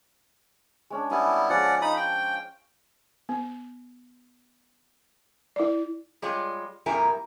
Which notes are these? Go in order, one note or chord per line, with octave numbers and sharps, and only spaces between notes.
G#3 C#4 D4
G3 B3 E4 G#5
F3 G#3 C#4 D5 F#5
D#4 F5 B5 D#6
G5
B3
E4 D5
G3 G#3 F4 C#5
F2 A#2 G3 E4 A#4 G#5